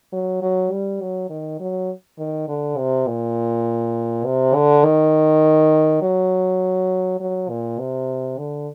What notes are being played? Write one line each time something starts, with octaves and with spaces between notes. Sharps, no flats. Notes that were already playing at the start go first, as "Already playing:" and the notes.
F#3
F#3
G3
F#3
D#3
F#3
D#3
D3
C3
A#2
C3
D3
D#3
F#3
F#3
A#2
C3
D3